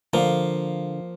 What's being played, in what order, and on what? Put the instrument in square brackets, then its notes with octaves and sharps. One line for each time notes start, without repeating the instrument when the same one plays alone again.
[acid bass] D3 [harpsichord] F3 A#3